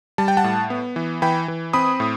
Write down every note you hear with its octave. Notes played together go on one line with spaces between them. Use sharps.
G3 A5
G5
F#5 A5
A2
B3
E3
E3 G5 B5
E3
C4 B5 D#6
A2